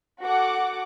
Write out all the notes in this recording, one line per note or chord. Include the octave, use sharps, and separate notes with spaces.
F#4 A4 F#5 D6